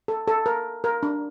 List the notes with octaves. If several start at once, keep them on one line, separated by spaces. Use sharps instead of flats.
A4
A4
A#4
A#4
D4